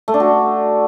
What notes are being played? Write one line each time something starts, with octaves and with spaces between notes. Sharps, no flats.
A3
D4
F#4